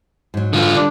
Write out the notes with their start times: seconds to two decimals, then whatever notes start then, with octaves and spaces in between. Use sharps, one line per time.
0.34 G#2 F#3
0.53 D3 F4
0.76 D3 G3 A#3 D4